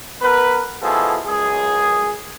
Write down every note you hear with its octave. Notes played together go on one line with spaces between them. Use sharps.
B3 A#4 B4
B2 F3 E4 G#4 A4
C#2 F#2 G#4